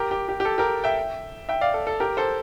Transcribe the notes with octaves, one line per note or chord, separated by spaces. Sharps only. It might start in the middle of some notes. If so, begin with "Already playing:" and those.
Already playing: G4 A#4
G4
G4
G4
A4
G4 A#4
E5 G5
E5 G5
D5 F5
A4
A4
G4 A#4
A4 C5